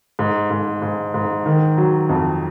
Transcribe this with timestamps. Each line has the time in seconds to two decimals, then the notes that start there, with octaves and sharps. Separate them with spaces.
0.19 G#2
0.50 G#2
0.82 G#2
1.14 G#2
1.46 D#3
1.77 F#3
2.09 F2